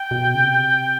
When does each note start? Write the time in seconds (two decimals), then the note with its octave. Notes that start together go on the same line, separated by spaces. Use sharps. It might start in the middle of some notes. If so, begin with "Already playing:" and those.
Already playing: G5
0.11 B2
0.35 C#3
0.41 C3